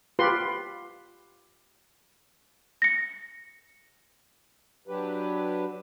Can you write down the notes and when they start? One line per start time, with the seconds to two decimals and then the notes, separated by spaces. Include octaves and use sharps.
0.19 F4 G4 B4 C6
2.82 A#6 C#7
4.88 F#3 D4 G4 B4